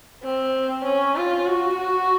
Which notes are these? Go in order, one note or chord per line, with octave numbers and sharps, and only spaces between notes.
C4
C#4
F4
F#4